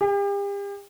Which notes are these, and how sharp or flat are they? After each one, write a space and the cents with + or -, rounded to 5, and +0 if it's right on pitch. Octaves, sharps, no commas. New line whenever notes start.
G4 +40